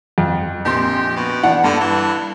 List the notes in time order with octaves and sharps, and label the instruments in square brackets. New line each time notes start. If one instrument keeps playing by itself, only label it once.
[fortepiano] F2
[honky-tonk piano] A#1 C4 C6 [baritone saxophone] G4
[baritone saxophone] B2
[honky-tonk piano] E3 D4 [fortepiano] F#5
[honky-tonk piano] G2 [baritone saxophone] D3
[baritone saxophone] E3